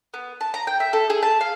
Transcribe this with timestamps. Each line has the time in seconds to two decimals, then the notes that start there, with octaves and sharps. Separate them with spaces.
0.14 B3
0.41 A5
0.54 A#5
0.67 G5
0.80 E5
0.93 A4
1.10 G#4
1.23 A5
1.41 F5